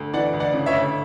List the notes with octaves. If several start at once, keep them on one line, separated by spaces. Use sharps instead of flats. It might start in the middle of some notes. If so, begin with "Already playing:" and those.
Already playing: D2
E3 D5 F#5
D2
D5 F#5
C#3
C#5 E5
D2